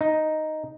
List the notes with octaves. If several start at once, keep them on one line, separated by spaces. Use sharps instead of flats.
D#4